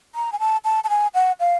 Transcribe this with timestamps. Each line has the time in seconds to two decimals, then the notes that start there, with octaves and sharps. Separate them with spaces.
0.15 A#5
0.33 G#5
0.40 A5
0.65 A5
0.84 A5
0.90 G#5
1.15 F#5
1.40 F5